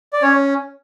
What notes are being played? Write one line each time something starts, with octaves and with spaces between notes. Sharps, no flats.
D5
C#4 C#5